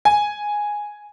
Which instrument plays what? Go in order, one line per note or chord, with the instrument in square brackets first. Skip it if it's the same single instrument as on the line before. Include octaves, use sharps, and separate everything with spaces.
[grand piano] G#5